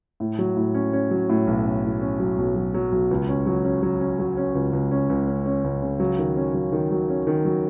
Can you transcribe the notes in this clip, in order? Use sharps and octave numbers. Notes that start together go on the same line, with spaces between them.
A2
F#3
A2
C#4
C#4
F#3
A2
B1
C#4
A2
C#4
F#3
B1
F#3
F#3
B1
C#2
C#4
F#3
C#4
F#3
C#4
F#3
C#4
C#2
C#2
C#4
C#2
C#4
C#4
C#2
C#3
F#3
D#3
C#4
F#3
D#3
F#3
C#4
D#3
F#3